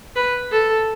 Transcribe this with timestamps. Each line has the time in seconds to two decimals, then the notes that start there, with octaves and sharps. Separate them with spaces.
0.16 B4
0.52 A4